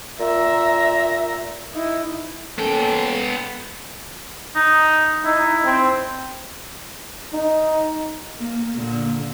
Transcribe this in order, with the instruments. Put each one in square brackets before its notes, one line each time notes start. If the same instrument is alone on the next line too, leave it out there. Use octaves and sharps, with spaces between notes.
[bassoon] A#2 [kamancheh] E5 A#5
[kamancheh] D#4 E4
[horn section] A#3 C#4 A4 [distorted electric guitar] B3 G5
[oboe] D#4
[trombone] D#4 [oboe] E4
[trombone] C4
[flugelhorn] D#4
[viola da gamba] A#3
A#2 D3